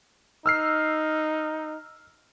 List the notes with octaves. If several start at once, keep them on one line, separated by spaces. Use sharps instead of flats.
D#4 E6 F6 C7